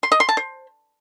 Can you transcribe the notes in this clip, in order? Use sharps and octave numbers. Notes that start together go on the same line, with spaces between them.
C6
D#5
C6
A5
C5